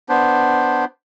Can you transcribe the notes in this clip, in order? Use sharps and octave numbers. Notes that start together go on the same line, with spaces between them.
B3 D4 C5